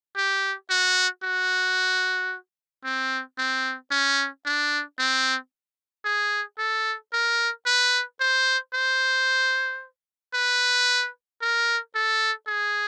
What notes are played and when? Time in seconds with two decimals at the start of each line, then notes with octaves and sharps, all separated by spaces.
0.17 G4
0.70 F#4
1.23 F#4
2.84 C4
3.38 C4
3.91 C#4
4.45 D4
4.98 C4
6.05 G#4
6.58 A4
7.13 A#4
7.66 B4
8.20 C5
8.74 C5
10.34 B4
11.41 A#4
11.94 A4
12.47 G#4